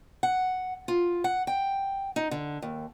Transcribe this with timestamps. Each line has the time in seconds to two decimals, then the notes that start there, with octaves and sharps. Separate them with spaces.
0.23 F#5
0.88 F4
1.24 F#5
1.47 G5
2.16 D#4
2.31 D3
2.62 D#2